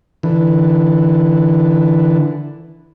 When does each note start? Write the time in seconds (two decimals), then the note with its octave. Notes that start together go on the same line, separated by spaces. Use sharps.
0.23 D3 E3